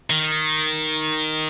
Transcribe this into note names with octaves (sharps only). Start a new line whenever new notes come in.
D#3